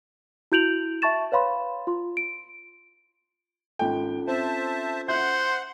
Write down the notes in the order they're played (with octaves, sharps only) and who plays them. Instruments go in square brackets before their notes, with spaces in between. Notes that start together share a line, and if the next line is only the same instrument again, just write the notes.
[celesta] E4 F#4 G6 D7 F7 F#7
E5 A5 C#6 A6 E7
B4 C#5 F5 B5 C6
F4 C6
D7
[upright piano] G#1 G5 [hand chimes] C#4 F4 A4
[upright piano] C4 [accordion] C5 E5 A5
[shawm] C5 [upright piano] E5 G6 [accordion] F#5